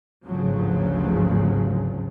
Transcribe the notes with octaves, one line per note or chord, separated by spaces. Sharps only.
G#1 D2 G2 C#3 F3 F#3